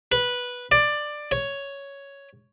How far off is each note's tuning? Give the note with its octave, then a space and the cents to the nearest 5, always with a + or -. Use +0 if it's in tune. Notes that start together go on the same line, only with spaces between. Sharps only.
B4 -10
D5 +15
C#5 +5